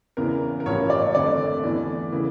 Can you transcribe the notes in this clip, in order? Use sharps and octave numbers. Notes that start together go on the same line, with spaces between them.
E2 C#3 E3 A#4
A#4
A1 G2 F3 A#3 C#5
D5
F2 D3 A3 D5
E2 E3 A3
C#3 E3 A#3